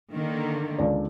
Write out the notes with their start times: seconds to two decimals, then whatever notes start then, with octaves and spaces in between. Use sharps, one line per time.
0.13 D3 D#3 A#3
0.78 C#2 D4 D5